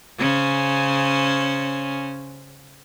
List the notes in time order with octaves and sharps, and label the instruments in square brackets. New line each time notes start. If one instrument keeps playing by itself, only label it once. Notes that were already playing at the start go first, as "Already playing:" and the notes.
[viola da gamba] C#3 C#4 C5